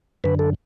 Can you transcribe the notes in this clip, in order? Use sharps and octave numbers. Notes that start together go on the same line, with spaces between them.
F#2 D3 B4
A4